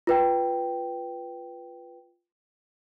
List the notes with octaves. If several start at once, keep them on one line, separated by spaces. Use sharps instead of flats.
F4 B4 G5